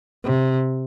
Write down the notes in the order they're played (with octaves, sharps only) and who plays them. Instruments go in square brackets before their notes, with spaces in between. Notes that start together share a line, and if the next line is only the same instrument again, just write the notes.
[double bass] C3